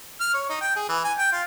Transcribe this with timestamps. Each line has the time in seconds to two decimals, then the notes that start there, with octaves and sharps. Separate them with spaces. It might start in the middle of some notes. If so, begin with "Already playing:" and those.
0.20 F6
0.34 C#5
0.50 D#4
0.61 G5
0.76 G#4
0.89 E3
1.04 G#5
1.18 G5
1.32 F4